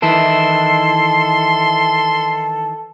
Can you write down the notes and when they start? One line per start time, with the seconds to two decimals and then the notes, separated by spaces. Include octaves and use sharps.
0.02 D#3 E3 E4 A4 C6